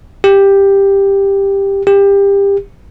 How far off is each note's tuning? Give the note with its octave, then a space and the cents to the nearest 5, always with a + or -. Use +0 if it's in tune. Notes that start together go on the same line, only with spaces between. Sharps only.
G4 +10
G4 +25